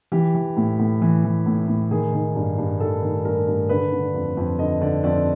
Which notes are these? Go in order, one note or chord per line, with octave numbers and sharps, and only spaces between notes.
E3 G4
E3
A2
A2
E3
E3
A2
A2
D#3 G#4
D#3
G2
G2
D#3 A4
D#3
G2 A#4
G2
D3 B4
D3
F2
F2
D3 D#5
D3 D5
F2 D5